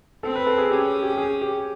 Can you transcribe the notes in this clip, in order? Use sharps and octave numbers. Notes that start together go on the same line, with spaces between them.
C4 A4
B4
A4
G#4
C#4 G4
G4
G#4
G4